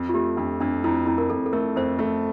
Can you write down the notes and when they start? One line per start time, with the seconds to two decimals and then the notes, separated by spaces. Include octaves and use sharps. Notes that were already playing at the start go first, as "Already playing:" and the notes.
Already playing: F2
0.09 F4
0.14 A3 G4
0.37 F2 D4
0.60 F2 D4
0.84 F2 E4
1.07 F2 E4
1.18 A#4
1.30 F2 A4
1.46 A4
1.53 A3 A#4
1.76 F2 C5
1.99 A3